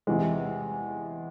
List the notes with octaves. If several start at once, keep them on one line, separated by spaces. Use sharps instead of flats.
E2 C3 E3 G#3